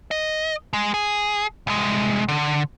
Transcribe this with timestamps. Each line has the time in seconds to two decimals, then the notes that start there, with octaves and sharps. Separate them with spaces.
0.11 D#5
0.73 G#3
0.94 G#4
1.67 C2 G#3
2.28 D3